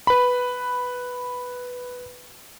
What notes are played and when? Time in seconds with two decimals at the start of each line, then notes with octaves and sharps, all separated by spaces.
0.07 B4 B5